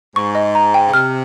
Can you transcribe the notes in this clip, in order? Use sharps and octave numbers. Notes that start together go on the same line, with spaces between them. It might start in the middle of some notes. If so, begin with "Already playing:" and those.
G#2 C#6
D#5
A#5
G5
C#3
C3 F6